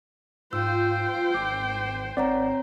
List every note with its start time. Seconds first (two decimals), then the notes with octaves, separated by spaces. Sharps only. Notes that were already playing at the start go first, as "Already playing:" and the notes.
0.53 G#2 F4 C5 G5 E6
1.34 G#1 D6
2.17 G#1 C4 C#5 D5 F#5 A#5